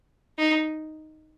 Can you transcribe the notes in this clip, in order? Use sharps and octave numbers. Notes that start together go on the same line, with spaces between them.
D#4